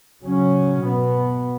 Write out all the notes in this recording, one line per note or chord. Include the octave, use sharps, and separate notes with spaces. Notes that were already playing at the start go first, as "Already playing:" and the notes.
C#3 F#3 C#4
B2 B3